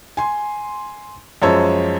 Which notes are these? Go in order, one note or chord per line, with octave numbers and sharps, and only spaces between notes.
G#5 C6
F#2 F3 G#3 C#5 A5 E6